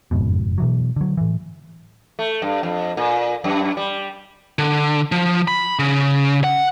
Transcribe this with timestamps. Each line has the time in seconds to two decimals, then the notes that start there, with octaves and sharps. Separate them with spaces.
0.11 F#1 F2 G#2 B2
0.58 B2 E3 F#3
0.96 D3 F#3
1.17 A2 E3
2.19 A3
2.42 G2
2.63 F2
2.97 A#2
3.44 F#2
3.77 G3
4.59 D3
5.12 F3
5.48 B5
5.79 C#3
6.44 F#5